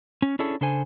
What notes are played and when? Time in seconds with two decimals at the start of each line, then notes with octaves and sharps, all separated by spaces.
0.22 C#4
0.39 C#4 D4 E4 G#4 A4 C#5
0.61 C#3 D4 A4 C5 G#5